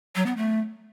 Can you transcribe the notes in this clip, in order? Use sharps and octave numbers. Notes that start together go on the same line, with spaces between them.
F#3
B3
A3